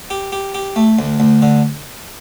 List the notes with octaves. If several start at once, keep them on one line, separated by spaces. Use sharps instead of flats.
G4
G4
G4
A3
D2
D2
D3